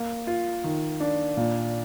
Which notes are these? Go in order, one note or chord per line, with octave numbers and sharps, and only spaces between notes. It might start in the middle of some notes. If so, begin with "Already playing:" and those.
Already playing: A#3
F4
D#3
D4
A#2